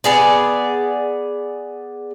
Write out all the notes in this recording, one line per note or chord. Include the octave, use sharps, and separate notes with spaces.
B3 G#4 D5